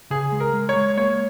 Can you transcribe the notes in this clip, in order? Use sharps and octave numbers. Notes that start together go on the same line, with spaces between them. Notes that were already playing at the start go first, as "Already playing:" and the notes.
C#3 G#4
G#3
A#4
G#3
C#5
G#3
A#3 C#5